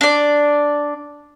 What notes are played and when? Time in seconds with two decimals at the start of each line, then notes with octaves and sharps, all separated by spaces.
0.01 D4 D5